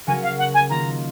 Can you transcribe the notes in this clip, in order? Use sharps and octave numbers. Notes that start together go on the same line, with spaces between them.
C#3 F#3 C#4 F#4 A#4 G#5
F5
F#5
G#5
D#3 A#3 F4 A#5